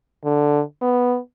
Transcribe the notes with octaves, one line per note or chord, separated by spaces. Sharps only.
D3
B3